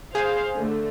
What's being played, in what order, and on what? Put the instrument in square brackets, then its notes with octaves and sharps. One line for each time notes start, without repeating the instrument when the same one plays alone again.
[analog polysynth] G#4 [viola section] C5 F5
[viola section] D3 A3